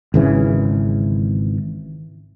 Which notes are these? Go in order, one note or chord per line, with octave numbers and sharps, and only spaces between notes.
G#1 C#3 E3